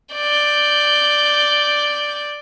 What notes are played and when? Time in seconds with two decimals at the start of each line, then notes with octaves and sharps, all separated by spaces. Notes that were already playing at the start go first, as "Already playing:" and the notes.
0.15 D5 G6